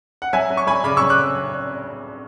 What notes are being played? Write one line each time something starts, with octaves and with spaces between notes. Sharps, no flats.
F#5
F#3 E5 G#5
F#3
C#6
F#3 G#5 B5
C#3 B5 D6
F#3 C#6 E6
D6 F#6